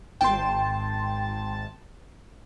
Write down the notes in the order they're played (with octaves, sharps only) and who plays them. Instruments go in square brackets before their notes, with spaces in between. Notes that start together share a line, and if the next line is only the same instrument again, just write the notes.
[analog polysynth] G#1 A5 [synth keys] G5 C6